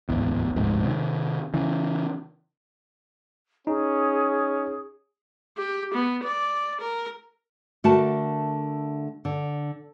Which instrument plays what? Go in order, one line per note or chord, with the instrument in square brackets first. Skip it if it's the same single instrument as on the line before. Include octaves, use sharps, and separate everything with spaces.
[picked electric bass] D1 G#1 E2
D1 A#1 G#2 C3
C3 D#3
C#3 E3
[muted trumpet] C#4 [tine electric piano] D#4 [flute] G#4
[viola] G4
B3
D5
A#4
[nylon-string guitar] D3 A3 F#4 A#4 A5
D3